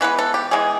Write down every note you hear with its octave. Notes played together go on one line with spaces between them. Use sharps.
E3 G#3 B3 B4
A4
G4
E3 G#3 B3 G#4